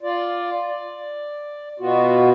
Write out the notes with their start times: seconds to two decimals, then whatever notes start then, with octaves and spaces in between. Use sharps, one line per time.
0.03 F4 D5
0.68 D5
1.80 B2 B3 F4 F#4